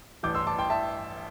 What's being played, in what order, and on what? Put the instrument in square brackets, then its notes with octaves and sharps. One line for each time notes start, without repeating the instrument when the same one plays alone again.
[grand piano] A1 G2 E3 D6 G6
C6 E6
A5 D6
G5 C6
E5 A5